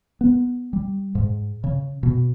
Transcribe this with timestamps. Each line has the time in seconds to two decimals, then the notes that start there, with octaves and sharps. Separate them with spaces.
0.21 B3
0.73 G3
1.15 G#2
1.64 C#3
2.03 B2